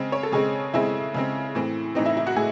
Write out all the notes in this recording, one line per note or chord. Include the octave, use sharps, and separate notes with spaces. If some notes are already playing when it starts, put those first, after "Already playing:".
Already playing: C#3 G#3 C4
C#5
A4
C#3 G#3 C4 G#4
C#3 G#3 C4 E4
C#3 G#3 C4
A2 E3 C4
A2 E3 C4 D#4
E4
E4
F#4
A2 G#4